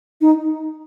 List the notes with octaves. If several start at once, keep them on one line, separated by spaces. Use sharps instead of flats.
D#4